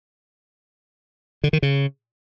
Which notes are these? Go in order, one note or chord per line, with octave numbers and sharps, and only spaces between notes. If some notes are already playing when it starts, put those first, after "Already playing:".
D3
D#3
C#3